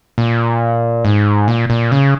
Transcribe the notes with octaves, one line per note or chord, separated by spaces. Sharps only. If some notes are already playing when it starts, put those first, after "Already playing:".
A#2
G#2
A#2
A#2
C#3